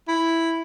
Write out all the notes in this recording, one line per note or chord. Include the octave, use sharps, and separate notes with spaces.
E4